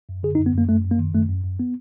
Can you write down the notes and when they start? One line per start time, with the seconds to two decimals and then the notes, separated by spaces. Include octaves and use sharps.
0.09 F#2
0.23 D3 G#4
0.35 D#4
0.39 F#2
0.46 B3
0.54 F#2 A#3
0.69 F#2 A3
0.85 F#2
0.91 A#3
0.99 D#3
1.14 F#2 A3
1.29 F#2
1.44 F#2
1.59 B3